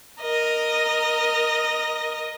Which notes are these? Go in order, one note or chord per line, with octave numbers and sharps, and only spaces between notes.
A#4 D#5